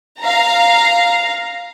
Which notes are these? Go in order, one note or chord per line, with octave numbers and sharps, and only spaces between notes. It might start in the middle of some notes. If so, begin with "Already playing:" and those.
F5 A#5